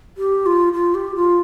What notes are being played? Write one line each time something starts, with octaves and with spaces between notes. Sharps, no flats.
G4
F4
F4
G4
F4